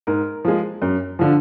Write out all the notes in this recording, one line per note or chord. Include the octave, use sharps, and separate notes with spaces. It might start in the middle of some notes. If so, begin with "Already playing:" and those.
G#2 A#4
F3 G#3
F#2
D3 F3